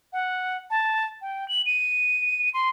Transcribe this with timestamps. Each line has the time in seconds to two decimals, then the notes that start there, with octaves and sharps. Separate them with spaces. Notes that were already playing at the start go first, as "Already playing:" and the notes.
0.13 F#5
0.70 A5
1.22 G5
1.48 F#7
1.66 D#7
2.54 C6